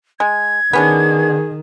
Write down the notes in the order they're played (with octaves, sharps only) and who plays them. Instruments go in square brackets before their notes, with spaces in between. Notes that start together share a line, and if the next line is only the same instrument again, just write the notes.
[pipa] G#3 [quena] G#6
[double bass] D#3 [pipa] B3 C#4 D4 [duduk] G#4